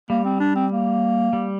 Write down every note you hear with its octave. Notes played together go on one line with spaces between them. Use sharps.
G3 A#3
C4
D4
C4
A#3
G3